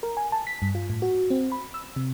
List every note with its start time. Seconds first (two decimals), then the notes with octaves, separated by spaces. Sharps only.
0.03 A#4
0.17 G#5
0.32 A5
0.47 B6
0.62 G2
0.75 F4
0.90 A2
1.02 F#4
1.30 C4
1.52 B5
1.74 E6
1.96 C3